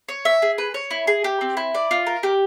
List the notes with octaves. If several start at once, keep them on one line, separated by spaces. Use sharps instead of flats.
C#5
E5
G#4
B4
C#5
E4
G#4
G4
C4
E4
D5
F4
A#4
G4